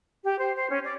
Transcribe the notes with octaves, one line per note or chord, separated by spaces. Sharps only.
G4
C5
C5
C#4
D5